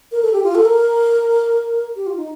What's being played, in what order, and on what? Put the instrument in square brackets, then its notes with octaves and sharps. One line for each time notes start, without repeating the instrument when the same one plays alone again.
[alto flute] A#4
A4
G4
F4
A4
A#4
G4
F4
D#4